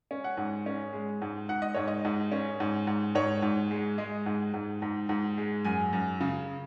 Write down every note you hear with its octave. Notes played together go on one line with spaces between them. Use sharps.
C#4
F#5
G#2
C#4
G#3
G#2
G#2 F#5
D#5
G#2 C#5
D#5
G#2
C#4
G#2
G#2
G#2 C#5
G#2
G#3
G#3 D#5
G#2
G#2
G#2
G#2
G#3
F#2 G#5
F#2
C#3